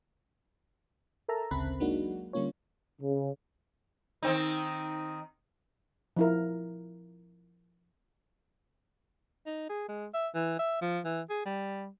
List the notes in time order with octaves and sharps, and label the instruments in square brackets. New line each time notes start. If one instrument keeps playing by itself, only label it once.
[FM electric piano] A4 A#4 E5 A5 A#5
A1 D2 C#3 C4 B5 F#6
F#3 G#3 A#3 D4 D#4 F#4
D3 G3 A#3 C#4 F4 C#5
[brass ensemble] C#3
[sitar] D#3 C4 D#4
[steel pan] F3 E4 A#4
[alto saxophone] D#4
G#4
G#3
E5
E3
E5
F3
E3
G#4
G3